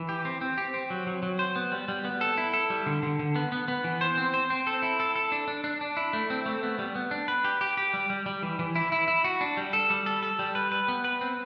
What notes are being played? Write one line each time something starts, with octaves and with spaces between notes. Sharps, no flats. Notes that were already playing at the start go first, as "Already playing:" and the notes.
Already playing: E3
G4
C4
C4
G4
C4
F#3
F#3
F#3
C5
B3
G3
G3
B3
A4
E4
A4
G3
D3
D3
D3
B3
B3
B3
E3
C5
C4
C5
C4
A4
E4
A4
A4
D4
D4
D4
D4
E4
A3
C4
A3
B3
G3
B3
D4
B4
G4
G4
G4
G3
G3
G3
E3
E3
E4
E4
E4
F#4
D4
G3
A4
G3
A4
A4
G3
B4
B4
B3
B4
C4